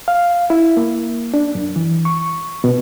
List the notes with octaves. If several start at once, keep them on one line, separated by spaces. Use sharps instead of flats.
F5
E4
A#3
D4
F#2
E3
C#6
B2